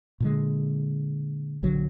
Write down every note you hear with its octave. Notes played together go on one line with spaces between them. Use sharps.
A#2 D3 G#3
A#1 D3 F#3